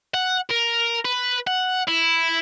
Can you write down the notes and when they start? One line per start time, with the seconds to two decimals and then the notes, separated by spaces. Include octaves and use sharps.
0.14 F#5
0.51 A#4
1.05 B4
1.47 F#5
1.88 E4